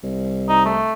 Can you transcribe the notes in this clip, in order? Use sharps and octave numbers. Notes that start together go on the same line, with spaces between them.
C2
D#4
A3